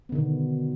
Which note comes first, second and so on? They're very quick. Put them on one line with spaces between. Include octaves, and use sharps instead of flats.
B3 D3 D#3 B2